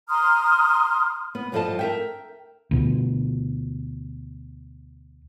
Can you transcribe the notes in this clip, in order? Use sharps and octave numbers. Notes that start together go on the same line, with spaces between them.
A#5 C6 D#6 F6
B3
D2 G2 F3 A4 D#5 A5
A#4 E5 G5
D2 B2